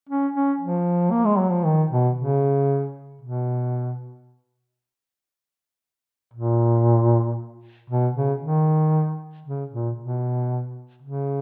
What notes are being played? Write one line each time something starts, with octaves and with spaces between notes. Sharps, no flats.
C#4
C#4
F3
A#3
G#3
F#3
F3
D#3
B2
C#3
B2
A#2
B2
C#3
D#3
C#3
A#2
B2
C#3